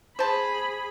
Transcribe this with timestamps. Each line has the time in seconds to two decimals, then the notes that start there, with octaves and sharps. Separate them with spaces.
0.19 G#4 C5 A5 B5